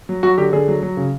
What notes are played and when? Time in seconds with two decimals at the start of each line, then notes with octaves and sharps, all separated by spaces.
0.09 F#3
0.23 F#3 F#4
0.38 D3 G4
0.53 D3 G#4
0.68 F#3
0.83 F#3
0.97 C#3